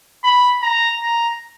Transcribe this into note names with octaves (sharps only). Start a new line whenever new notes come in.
B5
A#5
A#5